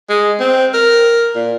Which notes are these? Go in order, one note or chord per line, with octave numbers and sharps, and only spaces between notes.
G#3
C4
A#4
A#2